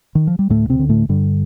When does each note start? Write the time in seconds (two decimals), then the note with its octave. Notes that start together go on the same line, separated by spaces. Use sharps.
0.15 D#3
0.27 F3
0.39 G3
0.49 D2 A2 A3
0.69 C3 C4
0.79 D3
0.89 A2 A3
1.09 G2 D3 G3